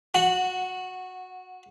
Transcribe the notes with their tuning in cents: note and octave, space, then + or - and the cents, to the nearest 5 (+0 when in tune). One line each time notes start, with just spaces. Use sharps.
F#4 -15 F#5 +0